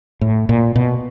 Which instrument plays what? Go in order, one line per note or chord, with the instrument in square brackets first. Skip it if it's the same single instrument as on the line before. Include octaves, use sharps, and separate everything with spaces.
[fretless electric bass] A2
A#2
B2